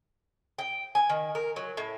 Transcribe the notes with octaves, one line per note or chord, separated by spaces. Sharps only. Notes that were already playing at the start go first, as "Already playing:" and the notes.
G5
G#5
D#3
A#4
F#3
A2